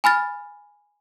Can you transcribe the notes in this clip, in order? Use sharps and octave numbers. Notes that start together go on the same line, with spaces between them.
G#5 B5 F6 A6